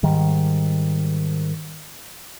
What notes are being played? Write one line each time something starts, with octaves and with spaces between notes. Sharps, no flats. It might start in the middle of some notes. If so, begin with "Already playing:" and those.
G#2 D#3 G3